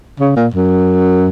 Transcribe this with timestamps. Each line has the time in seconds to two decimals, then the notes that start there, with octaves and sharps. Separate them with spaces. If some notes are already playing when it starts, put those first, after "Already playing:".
0.20 C#3
0.36 A#2
0.54 F#2